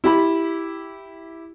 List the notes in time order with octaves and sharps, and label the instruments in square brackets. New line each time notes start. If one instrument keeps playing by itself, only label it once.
[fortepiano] E4 G4 B5